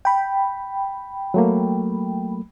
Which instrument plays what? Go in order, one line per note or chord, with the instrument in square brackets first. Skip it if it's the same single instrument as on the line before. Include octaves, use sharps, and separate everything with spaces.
[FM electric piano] G5 B5
[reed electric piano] F#3 A3 A#3